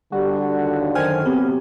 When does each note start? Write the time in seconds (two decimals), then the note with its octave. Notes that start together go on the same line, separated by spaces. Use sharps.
0.12 D3 G3 F#4
0.59 D#2
0.95 F#2 D#3 C5 G5 G#5 F6
1.26 C3 F#3 B3 C4 G4